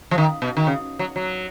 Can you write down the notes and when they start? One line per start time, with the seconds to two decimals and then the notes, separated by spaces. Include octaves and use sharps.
0.11 F3
0.18 D#3
0.42 B2
0.57 D#3
0.67 C#3
0.99 F#3
1.16 F#3